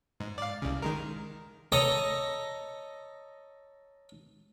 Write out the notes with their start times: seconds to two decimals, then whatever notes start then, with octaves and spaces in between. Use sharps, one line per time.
0.20 G#2
0.38 D5 F5
0.62 C2 C#3
0.82 D#3 G#3 A#4
1.72 A4 C#5 D#5 A#5